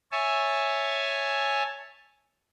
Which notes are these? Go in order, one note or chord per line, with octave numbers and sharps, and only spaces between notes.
C#5 E5 G#5 A5